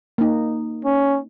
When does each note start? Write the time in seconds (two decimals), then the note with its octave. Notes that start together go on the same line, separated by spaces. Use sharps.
0.18 A#3 D#4
0.85 C#4